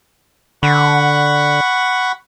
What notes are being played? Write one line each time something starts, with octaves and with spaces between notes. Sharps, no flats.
D3 F#5 B5 C#6